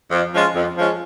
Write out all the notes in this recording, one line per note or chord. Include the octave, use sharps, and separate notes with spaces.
F2
F3 G#3 C#4 F4
F2
F3 G#3 C#4 F4